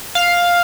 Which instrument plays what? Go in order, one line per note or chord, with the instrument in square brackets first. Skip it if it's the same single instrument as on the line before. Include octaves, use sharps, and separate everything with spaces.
[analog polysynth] F5